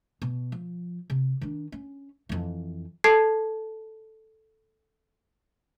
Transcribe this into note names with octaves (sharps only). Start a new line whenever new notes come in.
B2
F3
C3
D#3 D4
C#4
F2 E3
A4 A5 G#6 C7